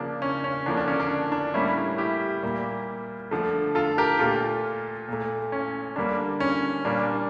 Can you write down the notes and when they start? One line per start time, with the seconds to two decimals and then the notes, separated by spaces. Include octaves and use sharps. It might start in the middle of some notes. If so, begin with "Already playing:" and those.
Already playing: C#3 F3 A#3 D4
0.22 C#4
0.44 C#4
0.66 D3 F3 A#3 D4
0.77 D4
0.88 C#4
1.00 D4
1.32 D4
1.54 A2 G3 A#3 C#4 E4
1.98 E4 G4
2.42 A#2 G3 A#3
3.31 D3 F3 A3
3.75 F4 A4
3.98 G4 A#4
4.19 A#2 A3 F4 A4
5.08 A#2 A3
5.52 C#4
5.96 D3 G3 A#3 D4
6.40 C#4
6.85 A#2 G3 A#3 D4